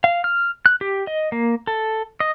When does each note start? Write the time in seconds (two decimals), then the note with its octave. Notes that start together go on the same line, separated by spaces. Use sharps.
0.04 F5
0.24 F6
0.66 F#6
0.81 G4
1.07 D#5
1.32 A#3
1.67 A4
2.20 D#5